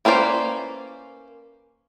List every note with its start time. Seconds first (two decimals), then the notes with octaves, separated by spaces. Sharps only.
0.05 A#3 C#4 B4 C5 D5